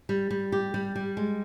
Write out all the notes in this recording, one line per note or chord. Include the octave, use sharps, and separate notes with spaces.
G3
G3
G4
G3
G3
G#3